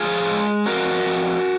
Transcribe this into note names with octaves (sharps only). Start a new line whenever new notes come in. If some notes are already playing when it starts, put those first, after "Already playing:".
Already playing: F3 F4 G#4
G#3
F2 F#4 A#4
F2